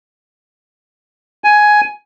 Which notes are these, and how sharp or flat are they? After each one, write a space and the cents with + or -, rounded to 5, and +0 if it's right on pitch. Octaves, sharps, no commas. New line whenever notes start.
G#5 +10